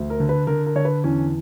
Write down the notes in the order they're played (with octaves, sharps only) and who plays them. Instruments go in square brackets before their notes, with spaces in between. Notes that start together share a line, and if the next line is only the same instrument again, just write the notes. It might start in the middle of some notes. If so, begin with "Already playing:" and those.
Already playing: [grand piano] D2
A#4
D3
B4
D3 A#4
A#4
D3 C#5
B4
E2 C#4